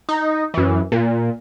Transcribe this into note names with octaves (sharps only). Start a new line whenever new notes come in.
D#4
F#2 E3
A#2